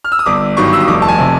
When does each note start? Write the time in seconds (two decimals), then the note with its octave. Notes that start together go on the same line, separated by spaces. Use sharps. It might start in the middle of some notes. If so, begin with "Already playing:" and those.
0.04 F6
0.12 E6
0.19 D#6
0.26 G1 D6
0.57 G2 D#3 F#3 C#6
0.73 E6
0.80 D#6
0.88 F1 D6
1.02 A5
1.08 G#5
1.18 C3